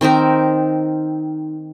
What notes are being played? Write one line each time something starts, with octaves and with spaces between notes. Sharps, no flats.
D#3 C4 D#4 A#4